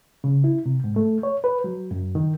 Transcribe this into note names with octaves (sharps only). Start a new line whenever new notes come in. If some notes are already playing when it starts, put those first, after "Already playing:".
C#3
E4
C3
G#2
A3
C#5
B4
F#3
F#2
D#3